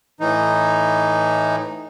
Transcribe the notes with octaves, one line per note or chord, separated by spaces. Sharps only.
A2 E3 D#4